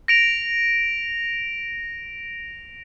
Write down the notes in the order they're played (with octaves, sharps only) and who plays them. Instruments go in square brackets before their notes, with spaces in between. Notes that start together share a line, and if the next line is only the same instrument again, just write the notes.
[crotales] A#6 D7 F7